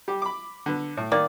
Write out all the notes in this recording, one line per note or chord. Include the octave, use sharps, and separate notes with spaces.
G3 G4
B5 D6
D3 B3
A2
D#3 A#3 D5